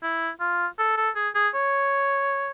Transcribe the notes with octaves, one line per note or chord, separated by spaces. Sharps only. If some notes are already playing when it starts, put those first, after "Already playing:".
E4
F4
A4
A4
G#4
G#4
C#5